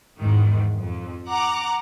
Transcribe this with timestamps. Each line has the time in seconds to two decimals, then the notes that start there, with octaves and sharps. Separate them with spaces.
0.20 E2 G#2 D#3
0.76 F2
1.29 F#5 A#5 D6